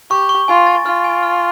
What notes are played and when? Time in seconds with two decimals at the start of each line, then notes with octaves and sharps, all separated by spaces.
0.10 G4 C#6
0.29 C#6
0.48 F4 G#5
0.67 A6
0.86 F4 F6
1.04 G#5
1.23 F6